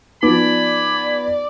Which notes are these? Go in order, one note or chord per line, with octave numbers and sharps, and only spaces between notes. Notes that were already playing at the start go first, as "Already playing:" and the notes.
F3 B3 D#4 D5 G#5 B5